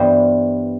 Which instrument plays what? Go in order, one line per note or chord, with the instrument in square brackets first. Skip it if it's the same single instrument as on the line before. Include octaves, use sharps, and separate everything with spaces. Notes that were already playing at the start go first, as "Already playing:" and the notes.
Already playing: [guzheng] G2 E3 G3 B3 D4 C5